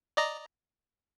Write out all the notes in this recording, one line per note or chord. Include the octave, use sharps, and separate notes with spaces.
D5 D#5 A#5